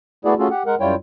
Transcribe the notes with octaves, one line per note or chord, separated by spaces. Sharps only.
A3 B3 E4 F#4 G#4 D5
A3 C#4 F4 F#4 G#4 A4
G4 F#5
G#3 A#4 F#5
F#2 G3 E4 F4 C#5 G5